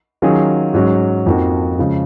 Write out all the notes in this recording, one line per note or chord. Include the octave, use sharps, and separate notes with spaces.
D#3 F#3 C#4 F4 G#4
G#2 F#3 C#4 F#4
F2 F3 A#3 D#4 F#4
C#3 F3 G#3